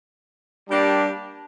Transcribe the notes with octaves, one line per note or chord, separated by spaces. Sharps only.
G3 A#3 D4 G4